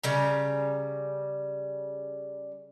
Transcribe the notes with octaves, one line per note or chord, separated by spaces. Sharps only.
C#3 G3 A#5